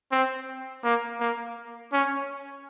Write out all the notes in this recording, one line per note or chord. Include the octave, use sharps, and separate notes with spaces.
C4
A#3
A#3
C#4